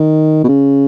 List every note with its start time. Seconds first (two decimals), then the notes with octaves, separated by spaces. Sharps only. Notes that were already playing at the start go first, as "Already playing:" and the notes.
Already playing: D#3
0.44 B2
0.48 C#3